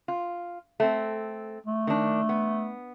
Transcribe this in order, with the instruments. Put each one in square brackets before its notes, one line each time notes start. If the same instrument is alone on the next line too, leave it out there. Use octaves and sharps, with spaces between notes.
[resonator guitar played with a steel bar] F4
A3 C4
[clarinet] A3
[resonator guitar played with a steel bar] D#3 D4
B3